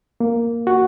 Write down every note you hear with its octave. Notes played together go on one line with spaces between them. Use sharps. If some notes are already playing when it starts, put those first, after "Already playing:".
A#3
F#4